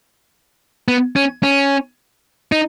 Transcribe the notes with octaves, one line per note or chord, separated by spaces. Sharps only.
B3
C#4
C#4
D#4